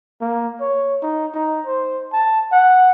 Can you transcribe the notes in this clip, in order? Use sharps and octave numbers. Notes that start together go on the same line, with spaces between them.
A#3
C#5
D#4
D#4
C5
A5
F#5